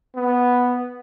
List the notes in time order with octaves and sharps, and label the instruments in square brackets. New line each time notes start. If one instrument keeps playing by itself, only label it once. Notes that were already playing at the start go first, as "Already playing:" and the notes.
[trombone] B3